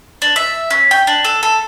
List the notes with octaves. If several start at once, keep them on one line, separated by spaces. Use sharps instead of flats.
D4
E5
C#4
G5
D4
A4
A4